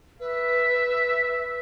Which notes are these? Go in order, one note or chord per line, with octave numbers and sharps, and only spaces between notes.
B4 E5